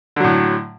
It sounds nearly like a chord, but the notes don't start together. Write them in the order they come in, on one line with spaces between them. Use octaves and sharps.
D3 F#3 A2